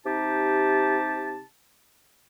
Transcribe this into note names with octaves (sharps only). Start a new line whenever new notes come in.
C3 D#4 G4 A5